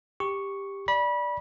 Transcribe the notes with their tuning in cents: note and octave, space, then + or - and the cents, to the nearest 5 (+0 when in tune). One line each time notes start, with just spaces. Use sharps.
G4 +10 C#6 +0
D5 +0 B5 -25